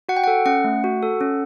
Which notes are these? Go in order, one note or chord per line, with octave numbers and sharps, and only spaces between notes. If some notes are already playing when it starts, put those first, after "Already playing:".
F#4 F#5
G5
A4 F#5
C#4 F#5
A3
F#4
A4
C#4